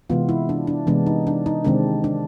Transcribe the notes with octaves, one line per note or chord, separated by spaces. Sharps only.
C3 E3 G#3 B3 F4
E4
D4
D4
C3 E3 G#3 B3 D4
D#4
D4
D#4
C3 D#3 G#3 C4 D4
D4